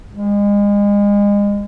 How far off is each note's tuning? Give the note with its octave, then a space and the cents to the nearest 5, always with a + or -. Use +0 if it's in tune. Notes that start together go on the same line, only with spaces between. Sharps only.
G#3 -35